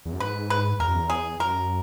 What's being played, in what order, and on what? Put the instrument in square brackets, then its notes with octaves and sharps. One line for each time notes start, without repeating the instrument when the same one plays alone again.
[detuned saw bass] E2
F#2
[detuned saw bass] G#2 [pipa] B4
[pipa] B4
[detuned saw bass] E2 [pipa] A#4
[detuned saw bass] F#2
E2
[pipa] G#4
[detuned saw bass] F#2 [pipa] A#4